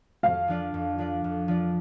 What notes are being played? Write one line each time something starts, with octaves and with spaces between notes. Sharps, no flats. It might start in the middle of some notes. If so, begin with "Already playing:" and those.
F2 F5
F3 D4 F4 D5
F2
F3 D4 F4 D5
F2
F3 D4 F4 D5